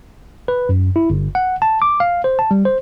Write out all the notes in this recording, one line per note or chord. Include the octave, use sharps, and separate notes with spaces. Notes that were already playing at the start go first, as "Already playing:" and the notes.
B4
F#2
E4
G1
F#5
A5
D6
F5
C5
A5
G3
C5